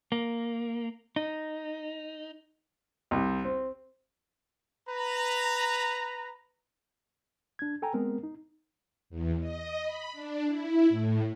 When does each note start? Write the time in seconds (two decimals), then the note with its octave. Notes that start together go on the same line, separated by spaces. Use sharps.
0.12 A#3
1.16 D#4
3.11 C2
3.45 C4
4.89 B4 A#5
7.59 D4 G#6
7.82 A4 G5 G#5 A#5
7.94 G#3 B3 C4 A#4
8.23 D#4
9.10 E2
9.40 D#5
9.82 B5
10.13 D4
10.45 E4
10.89 A2